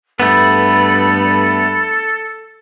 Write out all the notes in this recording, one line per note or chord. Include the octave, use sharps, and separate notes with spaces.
G2 A3 B3 A4 B5